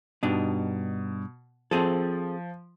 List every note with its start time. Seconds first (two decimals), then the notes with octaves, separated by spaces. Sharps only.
0.23 G2 B2 D4 D#4
1.71 F3 C4 G#4 A4